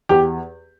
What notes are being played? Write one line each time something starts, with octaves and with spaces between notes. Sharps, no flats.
E2 G4